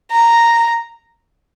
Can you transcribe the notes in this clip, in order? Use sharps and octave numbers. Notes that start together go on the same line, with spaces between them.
A#5